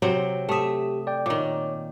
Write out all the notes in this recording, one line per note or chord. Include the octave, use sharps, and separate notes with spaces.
C3 F#3 C4
A3 G4 E5 D#6
D5 G5
A#2 D#3 C#5 D6